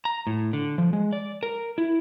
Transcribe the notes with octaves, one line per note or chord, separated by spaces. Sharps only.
A#5
A2
D3
F3
G#3
D5
A#4
E4